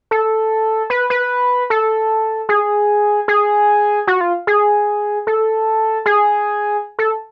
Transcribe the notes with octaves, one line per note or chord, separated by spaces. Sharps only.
A4
B4
B4
A4
G#4
G#4
F#4
F4
G#4
A4
G#4
A4